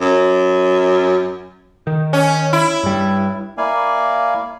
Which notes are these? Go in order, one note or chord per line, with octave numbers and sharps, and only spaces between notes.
F#2
D#3
C#4
E4
G2 G3
A#3 E4 D5 F5 G#5